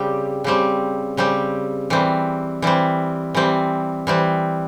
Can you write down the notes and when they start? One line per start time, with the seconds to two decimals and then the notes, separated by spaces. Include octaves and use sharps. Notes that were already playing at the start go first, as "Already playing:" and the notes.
Already playing: C#3 G3 C4 G4
0.44 C#3 G3 C4 G4
1.17 C#3 G3 C4 G4
1.90 E3 G3 C4
2.62 E3 G3 C4
3.35 E3 G3 C4
4.07 E3 G3 C4